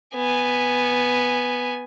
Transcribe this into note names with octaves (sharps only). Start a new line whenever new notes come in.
B3 G#5